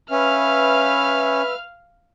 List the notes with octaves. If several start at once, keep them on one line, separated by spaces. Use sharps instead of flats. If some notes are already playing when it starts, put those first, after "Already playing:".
C#4 B4 E5 F5 F6